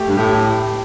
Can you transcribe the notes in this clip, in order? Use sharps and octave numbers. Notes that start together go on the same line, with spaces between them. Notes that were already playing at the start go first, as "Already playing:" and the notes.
Already playing: A3 G4
G2
A2 G4